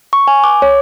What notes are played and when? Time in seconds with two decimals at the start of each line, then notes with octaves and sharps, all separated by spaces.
0.13 C#6
0.28 G#5
0.44 D6
0.62 C#5